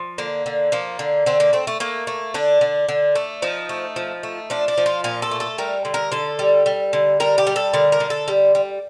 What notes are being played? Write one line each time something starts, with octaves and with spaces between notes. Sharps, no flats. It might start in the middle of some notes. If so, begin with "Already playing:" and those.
Already playing: F3
D3 A#3
D3
F3 A#3
D3
D3 C4
A#3
A3 C4
A3
A3 A#3
A3
D3 D4
D3
D3
A3
F3 D#4
A3
F3
A3
F3 D4
D4
F3
F4
A#2 F4
A4
A3
A4
G3 A#4
D3
A#4
D3 A4
G3
G3
D3
G3 A#4
G4
G3
A4
D3 A#4
A#4
D3
A4
G3
G3